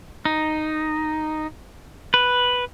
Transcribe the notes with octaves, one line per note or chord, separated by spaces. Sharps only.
D#4
B4